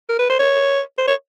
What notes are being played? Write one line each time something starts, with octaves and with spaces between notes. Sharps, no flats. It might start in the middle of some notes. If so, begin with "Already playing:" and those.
A#4
B4
C5
C#5
C5
C#5